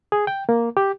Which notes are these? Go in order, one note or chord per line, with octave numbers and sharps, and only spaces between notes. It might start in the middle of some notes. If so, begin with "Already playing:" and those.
G#4
G5
A#3
G4